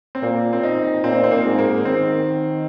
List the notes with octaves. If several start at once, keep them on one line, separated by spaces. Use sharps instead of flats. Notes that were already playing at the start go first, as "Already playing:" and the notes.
C4
A#2 A#3
C4
D#4
A#2 C4
C4
A#3
G#2
A#3
D#3 C4